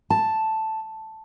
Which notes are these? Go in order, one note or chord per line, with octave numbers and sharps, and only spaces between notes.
A5